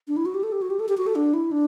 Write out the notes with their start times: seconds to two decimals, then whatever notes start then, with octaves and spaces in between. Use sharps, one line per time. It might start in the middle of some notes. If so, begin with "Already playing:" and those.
0.08 D4
0.17 E4
0.26 F#4
0.34 G4
0.43 A4
0.52 G4
0.62 F#4
0.70 G4
0.80 A4
0.89 G4
0.97 F#4
1.06 A4
1.15 D4
1.34 E4
1.51 D4